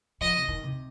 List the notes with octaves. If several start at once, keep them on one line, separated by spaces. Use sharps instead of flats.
F3 D#5
C3
D#3
C3